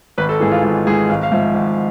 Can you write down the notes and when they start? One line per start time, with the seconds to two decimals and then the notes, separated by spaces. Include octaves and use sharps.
0.18 G#1 B4
0.29 A4
0.40 G#2 E3 G#4
0.52 F4
0.63 G#1 F4
0.87 G#2 E3 G#4
1.09 G#1 F5
1.23 F5
1.32 G#2 F3 E5
1.54 G#1